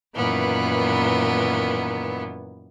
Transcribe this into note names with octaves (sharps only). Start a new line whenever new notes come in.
F#2 A#2 D#3 E3 B3